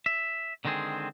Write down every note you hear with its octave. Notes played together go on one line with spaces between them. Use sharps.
E5
D3 D#3 G#3 C4 G#4